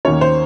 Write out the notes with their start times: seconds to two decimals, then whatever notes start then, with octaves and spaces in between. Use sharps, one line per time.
0.05 D#2 D#3 A#3 C#4 C#5
0.21 C5